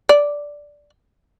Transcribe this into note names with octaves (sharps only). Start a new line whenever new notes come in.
D5